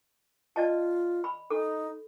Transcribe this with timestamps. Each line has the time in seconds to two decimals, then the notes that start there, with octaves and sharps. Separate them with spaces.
0.56 F4 D5 D#5 A5
1.24 B5
1.50 D#4 A4